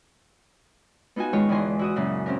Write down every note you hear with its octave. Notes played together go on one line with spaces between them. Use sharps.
B3 D#4 F4 F#4 G#5
D#3 G#3 F4 C#5
E2 D3 E3 D#5 G#5 C6
E4 F#4 D#6
F#2 A#2 C#3
C4 C#4 A#4